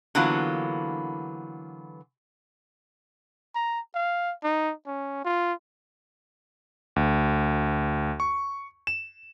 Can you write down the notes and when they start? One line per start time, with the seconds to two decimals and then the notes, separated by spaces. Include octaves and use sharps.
0.15 D3 E3 F#3 A#3 B3 F4
3.55 A#5
3.95 F5
4.44 D#4
4.86 C#4
5.25 F4
6.96 D2
8.20 C#6
8.87 E7